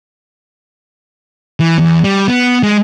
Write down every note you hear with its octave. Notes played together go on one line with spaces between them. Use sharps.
E3
E2
G3
B3
G#3